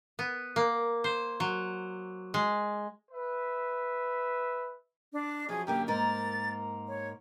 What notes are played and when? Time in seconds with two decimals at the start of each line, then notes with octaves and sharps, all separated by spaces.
0.19 B3
0.56 A#3
1.04 C5
1.40 F#3
2.34 G#3
3.11 B4 E5
5.13 D4
5.49 F#2 F3 G#4
5.67 F#2 D3 A#3 G4
5.88 G#2 A#3 A#4 A6
6.88 C#5